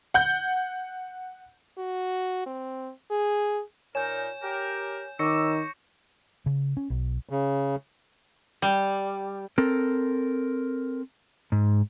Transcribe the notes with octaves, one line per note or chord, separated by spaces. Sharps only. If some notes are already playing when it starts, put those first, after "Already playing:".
F#5 G6
F#4
C4
G#4
A#2 D#4 A#4 C#5 G#5 G6 E7
G4 A#4
D#3 C#5 C#6 D6 E6 A#6 C#7
C#3
C#4
B1
C#3
G3
C4 A4 A#4
G#2